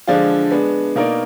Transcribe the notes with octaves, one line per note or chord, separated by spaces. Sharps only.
D3 F3 G#3 D4 F4
G#3 B3 D4
B2 A#3 D#4 A#4 D5